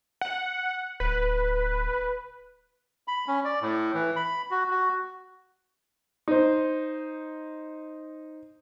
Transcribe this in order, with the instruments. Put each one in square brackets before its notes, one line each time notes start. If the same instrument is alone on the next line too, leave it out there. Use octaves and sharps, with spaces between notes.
[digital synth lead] F#5
[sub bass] D1 [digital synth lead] B4
[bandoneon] B5
C#4
D5
A2
E3
B5
F#4
F#4
[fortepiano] D#4 C5